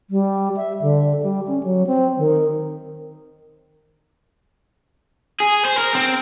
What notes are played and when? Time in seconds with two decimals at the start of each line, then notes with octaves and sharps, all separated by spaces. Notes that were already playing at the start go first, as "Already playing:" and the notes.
0.10 G3
0.56 E5
0.82 D3
1.23 G3
1.48 C#4
1.63 F#3
1.87 C4
2.18 D#3
5.40 G#4
5.65 C5
5.78 A#4
5.95 C4